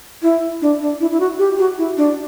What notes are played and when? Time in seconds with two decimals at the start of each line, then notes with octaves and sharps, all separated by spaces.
0.22 E4
0.62 D4
0.81 D4
1.01 E4
1.11 E4
1.20 F#4
1.39 G4
1.59 F#4
1.78 E4
1.97 D4